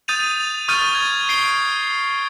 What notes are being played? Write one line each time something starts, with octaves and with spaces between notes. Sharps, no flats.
D#6 G6 A6 D#7 F7
C#6 D#6 F6 G6 A6 D#7
G#6
C7 D7 G7